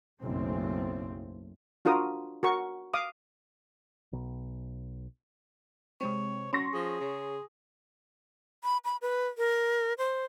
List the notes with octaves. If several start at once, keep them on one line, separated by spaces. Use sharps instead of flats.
F#1 B1 E2 A3 C4
D4 F4 F#4 A#4 D#6
F#4 A#4 C#6
F5 D6 D#6
B1
C3 G#3 C4 C#5
F#3 C#4 C6 C#6 A#6
F3 G#4
C#3
B5
B5
B4
A#4
C5